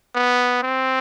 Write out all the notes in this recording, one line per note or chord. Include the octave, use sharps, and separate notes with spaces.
B3
C4